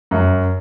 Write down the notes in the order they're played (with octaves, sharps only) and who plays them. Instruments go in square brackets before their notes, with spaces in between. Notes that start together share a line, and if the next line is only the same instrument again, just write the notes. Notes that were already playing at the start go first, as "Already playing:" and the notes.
[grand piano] F#2